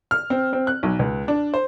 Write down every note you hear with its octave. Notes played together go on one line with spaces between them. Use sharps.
F6
C4
C4
F#6
B1
C#2
D4
C5